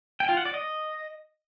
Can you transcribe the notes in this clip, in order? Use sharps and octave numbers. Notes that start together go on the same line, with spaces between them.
G5
F4
F#5
D5
D#5